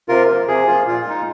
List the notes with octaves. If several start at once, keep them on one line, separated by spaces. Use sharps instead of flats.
C3 F4 A#4
F3 A#3 F4
C3 G#4
F3 A#3 F4
A#2 F4
G#3 D#4